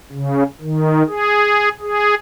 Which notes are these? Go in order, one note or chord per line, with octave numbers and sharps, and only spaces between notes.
C#3
D#3
G#4
G#4